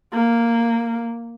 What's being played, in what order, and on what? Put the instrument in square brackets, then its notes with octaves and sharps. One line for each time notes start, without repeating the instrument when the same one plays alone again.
[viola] A#3